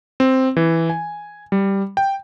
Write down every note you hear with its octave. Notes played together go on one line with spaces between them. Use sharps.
C4
E3
G#5
G3
G5